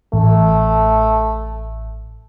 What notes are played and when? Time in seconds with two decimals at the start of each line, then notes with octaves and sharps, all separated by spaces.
0.13 A1 A3